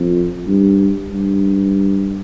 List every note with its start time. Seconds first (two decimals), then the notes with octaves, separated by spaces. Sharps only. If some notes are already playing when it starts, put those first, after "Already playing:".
Already playing: F2
0.47 G2
1.10 G2